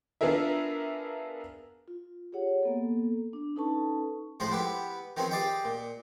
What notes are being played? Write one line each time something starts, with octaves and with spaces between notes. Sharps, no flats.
B3 D4 F4 G#4 A#4 E5
F4
G4 G#4 C#5 F#5
A#3 B3 A4
D4
C#4 D#4 A4 B4 A5 C#6
A2 F3 G#3 G#4 C5
B3 E4 G4 B4
D#3 F3 B3 C4 G#4
G4 G#4 D5 D#5 F5 G5
A#2